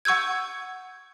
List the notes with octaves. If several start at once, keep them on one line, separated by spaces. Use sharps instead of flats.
F#5 C#6 E6 G6 G#6